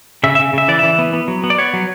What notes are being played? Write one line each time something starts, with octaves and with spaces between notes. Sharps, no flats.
C#3 E5
E5
C#3
C#3 E5
E3 D5
E3 E5
B3
B3
F#3
B3
D5
B3 C#5
F#3